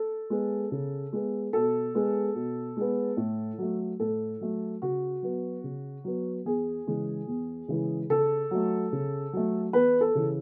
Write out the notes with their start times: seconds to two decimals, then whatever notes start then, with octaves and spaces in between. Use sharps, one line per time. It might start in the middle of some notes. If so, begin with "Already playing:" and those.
Already playing: A4
0.30 G#3 B3
0.71 C#3
1.13 G#3 B3
1.53 B2 A4
1.94 G#3 B3
2.35 B2
2.77 G#3 B3
3.17 A2
3.58 F#3 A3
4.00 A2 A4
4.41 F#3 A3
4.82 C#3 F#4
5.22 F#3 B3
5.63 C#3
6.04 F#3 B3
6.45 E2 G#4
6.87 C#3 E3 G#3
7.28 E2
7.68 C#3 E3 G#3
8.10 C#3 A4
8.51 F#3 A3
8.92 C#3
9.33 F#3 A3
9.73 E2 B4
10.01 A4
10.15 C#3 E3